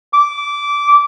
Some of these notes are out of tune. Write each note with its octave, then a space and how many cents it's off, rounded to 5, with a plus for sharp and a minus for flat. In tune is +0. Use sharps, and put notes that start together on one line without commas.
D6 -15